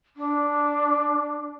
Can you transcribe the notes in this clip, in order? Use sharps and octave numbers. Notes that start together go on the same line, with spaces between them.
D4